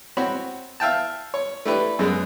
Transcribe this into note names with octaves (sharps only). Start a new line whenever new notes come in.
C4 F#4 C#5 B5
E5 F5 G5 A5
C#5
A3 D4 E4 G4 B4
F#2 G#3 B3